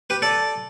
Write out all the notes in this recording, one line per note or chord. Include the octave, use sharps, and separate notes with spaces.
G4 B4
A4 D5